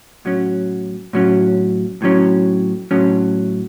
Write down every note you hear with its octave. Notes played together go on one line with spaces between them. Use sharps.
A2 F#3 C#4
A2 F#3 C#4
A2 F#3 C#4
A2 F#3 C#4